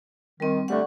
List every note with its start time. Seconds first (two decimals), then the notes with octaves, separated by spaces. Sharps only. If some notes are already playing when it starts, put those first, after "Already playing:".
0.40 D#3 G3 C4
0.68 D3 G3 A3 F#5 C#6